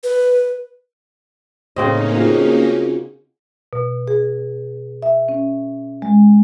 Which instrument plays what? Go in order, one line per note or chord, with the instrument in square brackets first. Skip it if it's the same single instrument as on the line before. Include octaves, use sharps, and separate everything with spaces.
[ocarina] B4
[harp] A2 [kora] C#3 C4 D#5 [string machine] A#3 C#4 D#4
[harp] F4 F#4 G#4
[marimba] B2
G#4
E5
C#4
G#3